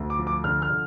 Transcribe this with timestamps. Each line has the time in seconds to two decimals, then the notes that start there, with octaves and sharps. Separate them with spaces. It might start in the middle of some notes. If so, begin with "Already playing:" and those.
Already playing: D2
0.10 D6
0.19 F3
0.27 D6
0.44 D3 F6
0.62 F6
0.70 D3